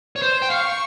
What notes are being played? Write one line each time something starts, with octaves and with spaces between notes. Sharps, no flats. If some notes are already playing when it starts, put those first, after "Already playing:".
C#5
C5 C6
G5
F5 C#6